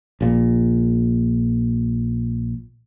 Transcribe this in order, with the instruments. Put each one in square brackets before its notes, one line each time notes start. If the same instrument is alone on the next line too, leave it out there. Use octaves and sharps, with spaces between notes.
[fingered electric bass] A#1 A#2